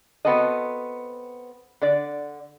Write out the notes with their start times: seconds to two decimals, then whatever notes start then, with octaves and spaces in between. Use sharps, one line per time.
0.25 B3 C4 F#4 A4 D#5
1.82 D3 D5